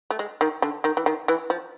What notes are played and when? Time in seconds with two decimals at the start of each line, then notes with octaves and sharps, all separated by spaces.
0.10 A3
0.19 G#3
0.41 D#3
0.62 D3
0.84 D#3
0.97 E3
1.06 D#3
1.28 E3
1.50 F3